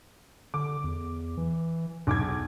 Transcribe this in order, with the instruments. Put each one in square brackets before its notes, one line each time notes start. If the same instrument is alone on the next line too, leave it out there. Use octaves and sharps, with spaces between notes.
[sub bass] D3 [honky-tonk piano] D6
[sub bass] E2
E3
[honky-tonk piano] B1 D6 G#6 [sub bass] E2